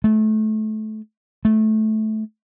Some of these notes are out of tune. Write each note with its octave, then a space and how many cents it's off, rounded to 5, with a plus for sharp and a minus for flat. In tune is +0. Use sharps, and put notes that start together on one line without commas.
A3 -25
A3 -15